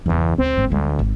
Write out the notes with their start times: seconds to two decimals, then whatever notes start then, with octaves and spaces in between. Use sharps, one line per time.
0.06 G1 E2 C#3
0.38 D2 C4
0.57 G1 G#2
0.70 D2 G3 G#3
0.99 G#1